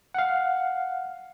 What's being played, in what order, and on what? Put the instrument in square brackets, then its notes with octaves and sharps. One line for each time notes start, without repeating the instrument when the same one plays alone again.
[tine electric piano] F5 F#5